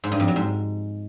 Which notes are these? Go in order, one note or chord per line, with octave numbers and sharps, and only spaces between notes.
G#2
G2
F2
F#3
G#2